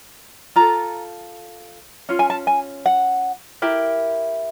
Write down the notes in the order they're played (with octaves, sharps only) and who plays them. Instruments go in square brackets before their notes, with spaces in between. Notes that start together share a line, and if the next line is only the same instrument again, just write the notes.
[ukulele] F4 A4 A#5
C#4 F4
G#5
A5
G#5
F#5
E4 G4 A#4